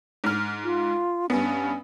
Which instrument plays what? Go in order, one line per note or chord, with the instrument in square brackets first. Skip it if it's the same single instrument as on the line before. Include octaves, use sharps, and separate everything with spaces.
[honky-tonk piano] G#2 F6
[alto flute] F4
[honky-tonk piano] G2 B3 [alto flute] C#4